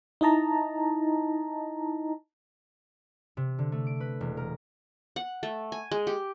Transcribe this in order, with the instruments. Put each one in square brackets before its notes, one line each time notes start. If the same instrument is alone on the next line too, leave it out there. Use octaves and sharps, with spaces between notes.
[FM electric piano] D#4 E4 D#5 A5 A#5
[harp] C3
D3
A3
D7
B4
E1
A#4
[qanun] F#5
A3
G#5
G#3
G4